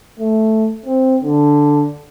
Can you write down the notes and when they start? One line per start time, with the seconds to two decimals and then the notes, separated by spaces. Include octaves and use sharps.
0.19 A3
0.86 C4
1.23 D3